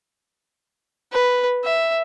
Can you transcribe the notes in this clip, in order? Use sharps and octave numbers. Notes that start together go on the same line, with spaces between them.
B4
E5